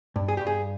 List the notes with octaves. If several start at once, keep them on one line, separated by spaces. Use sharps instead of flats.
G2
G#4
G2 G4
G#4